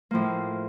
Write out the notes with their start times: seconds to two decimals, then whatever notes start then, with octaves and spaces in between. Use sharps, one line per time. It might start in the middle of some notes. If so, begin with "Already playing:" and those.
0.11 A2 F3 A#3